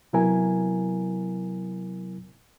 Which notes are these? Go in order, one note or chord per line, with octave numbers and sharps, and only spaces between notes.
C3 F#3 B3 E4 A#4 G#5